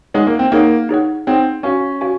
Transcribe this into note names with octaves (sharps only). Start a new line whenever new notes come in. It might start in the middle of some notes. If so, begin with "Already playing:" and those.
G#3 D#4 G#4 C#5 F#5
A#3
C4
A#3 D#4 G#4 C#5 F#5
D#4 G#4 C#5 F#5
C4 D#4 G#4 C#5 F#5
C#4 F#4 C#5 F5 G#5
F#4 C#5 F5 G#5